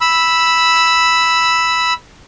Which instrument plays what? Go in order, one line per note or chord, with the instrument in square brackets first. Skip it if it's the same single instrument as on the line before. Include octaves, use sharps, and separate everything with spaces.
[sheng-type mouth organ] B5 E6